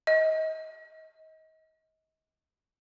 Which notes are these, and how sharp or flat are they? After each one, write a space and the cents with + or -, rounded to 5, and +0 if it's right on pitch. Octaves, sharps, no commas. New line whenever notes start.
D#5 +30